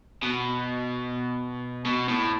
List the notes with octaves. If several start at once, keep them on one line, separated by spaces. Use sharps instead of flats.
B2
B2
A2